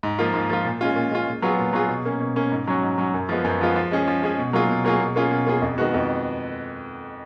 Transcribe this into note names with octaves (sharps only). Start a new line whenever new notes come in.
G#2
F3 A#3 F4
G#2
F3 A#3 F4
A#2
G#3 C#4 F4
A#2
G#3 C#4 F4
A#2
F#3 B3 F4 G#4
A#2
F#3 B3 F4 G#4
B2
A#3 C#4
B2
A#3 C#4
G#2
F#3 C#4 F#4
G#2
F#3 C#4 F#4
F#2
F3 G#3 B3 F4
F#2
F3 G#3 B3 F4
F3
G#3 C#4 G#4
F3
G#3 C#4 G#4
B2
F#3 A#3 F4 G#4
B2
F#3 A#3 F4 G#4
B2
A#3 C#4 F4 G#4
B2
A#3 C#4 F4 G#4
F2
D#3 G#3 B3 F#4
F2